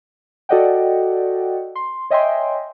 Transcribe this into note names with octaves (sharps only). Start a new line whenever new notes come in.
F#4 A4 D5 D#5 F#5 G5
C6
C#5 D#5 E5 G5 G#5 C6